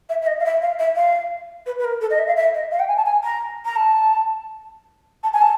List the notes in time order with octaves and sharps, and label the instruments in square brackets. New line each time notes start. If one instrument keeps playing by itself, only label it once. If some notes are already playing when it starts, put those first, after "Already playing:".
[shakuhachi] E5
E5
D#5
F5
E5
F5
E5
F5
B4
B4
A#4
A4
D#5
E5
F5
E5
D#5
F5
G5
G#5
A5
G#5
A#5
A#5
A5
A5
G#5
A5